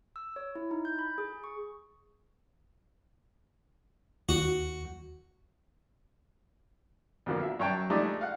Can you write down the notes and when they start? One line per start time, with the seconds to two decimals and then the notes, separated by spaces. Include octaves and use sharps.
0.16 E6
0.36 C#5
0.55 E4
0.71 D#4
0.85 G6
0.99 B5
1.18 G#4
1.44 C#6
4.29 D#2 F#4
7.26 F2 B2 D3 F3 A#3
7.43 E5
7.60 F#2 C#5 G5 A5
7.90 F3 G#3 A3 D4 D#4 G4
8.21 F5 F#5